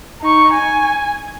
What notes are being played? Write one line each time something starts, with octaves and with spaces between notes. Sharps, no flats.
D#4 C#6
G#5